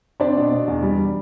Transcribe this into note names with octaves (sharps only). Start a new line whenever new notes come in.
C4 D4 D5
B2
B2
E2
G3
G3